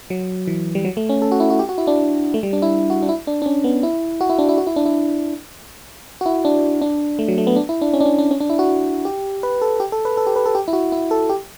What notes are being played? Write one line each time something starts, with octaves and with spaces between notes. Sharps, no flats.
F#3
E3
G3
F#3
A3
C#4
A4
F#4
E4
F#4
G4
F#4
E4
D4
A3
G3
D4
E4
F#4
D4
E4
D4
D4
C#4
B3
E4
F#4
E4
D4
E4
F#4
E4
D4
E4
F#4
E4
D4
D4
A3
F#3
A3
B3
D4
E4
D4
C#4
D4
C#4
D4
C#4
D4
E4
F#4
G4
B4
A4
G4
A4
B4
A4
G4
B4
A4
G4
E4
F#4
E4
A4
G4